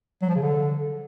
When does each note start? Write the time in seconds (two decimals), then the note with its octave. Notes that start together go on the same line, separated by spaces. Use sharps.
0.22 F#3
0.29 F3
0.35 C#3
0.42 D3